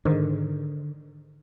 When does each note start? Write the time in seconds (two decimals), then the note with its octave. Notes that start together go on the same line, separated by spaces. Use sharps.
0.05 G#2 D3 D#3